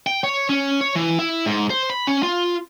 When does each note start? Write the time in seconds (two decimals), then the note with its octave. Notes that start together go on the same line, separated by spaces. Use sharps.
0.07 G5
0.24 C#5
0.49 C#4
0.81 C#5
0.95 E3
1.19 E4
1.46 G#2
1.70 C5
1.90 B5
2.07 C#4
2.23 F4